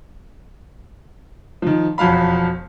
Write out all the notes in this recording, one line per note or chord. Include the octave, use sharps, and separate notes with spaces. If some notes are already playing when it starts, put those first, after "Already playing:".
D#3 F3
E1 F2 F#3 F5 B5